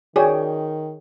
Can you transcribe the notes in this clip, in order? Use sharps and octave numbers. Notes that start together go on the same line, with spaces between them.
D#3 F#4 G#4 C#5 D5 G5 G#5